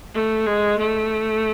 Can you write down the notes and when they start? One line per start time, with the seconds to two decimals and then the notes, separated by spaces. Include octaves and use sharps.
0.14 A3
0.46 G#3
0.78 A3